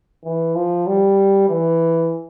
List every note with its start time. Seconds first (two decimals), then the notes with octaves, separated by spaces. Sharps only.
0.25 E3
0.55 F3
0.87 G3
1.49 E3